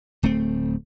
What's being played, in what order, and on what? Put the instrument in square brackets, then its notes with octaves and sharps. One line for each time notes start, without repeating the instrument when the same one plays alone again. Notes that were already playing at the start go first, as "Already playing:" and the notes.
[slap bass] D1 A3 C4